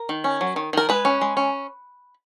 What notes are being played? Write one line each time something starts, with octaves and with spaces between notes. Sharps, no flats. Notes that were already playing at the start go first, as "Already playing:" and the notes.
Already playing: A#4
D#3
C#4
F#3
D#3
D#3 A#4
G#3 B4
C#4
G#3
C#4